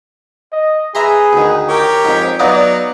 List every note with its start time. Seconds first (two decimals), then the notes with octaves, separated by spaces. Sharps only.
0.52 D#5
0.95 G#4 B4 E5 A#5 C6
1.33 D2 D#3
1.69 G4 A#4 C#5
2.05 F2 G#2
2.39 F#3 B3 D#4 D5 F5